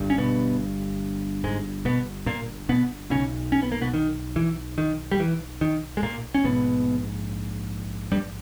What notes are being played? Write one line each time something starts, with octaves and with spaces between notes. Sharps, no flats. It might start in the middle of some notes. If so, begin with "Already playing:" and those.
Already playing: G1 G2
C#4
B2 B3
G#2 G#3
B2 B3
A#2 A#3
B2 B3
B1 A#2 C#3 C#4
C#4
B3
A#3
B2 B3
D#3
E3
D#3
G3
E3
D#3
G#3
A#2 A#3
C#4
A#1 G#2 B2 B3
G2 G3